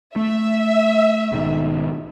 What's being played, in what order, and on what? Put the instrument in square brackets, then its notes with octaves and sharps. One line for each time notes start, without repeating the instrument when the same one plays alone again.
[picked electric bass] A3 [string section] E5
[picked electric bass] B1 G#2 D#3